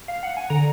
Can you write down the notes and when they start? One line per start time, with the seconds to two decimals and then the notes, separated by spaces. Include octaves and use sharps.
0.08 F5
0.23 F#5
0.37 G#5
0.50 D3 A#5